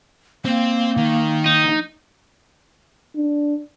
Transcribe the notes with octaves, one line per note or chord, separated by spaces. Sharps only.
A#3 C4
D#3
D#4
D4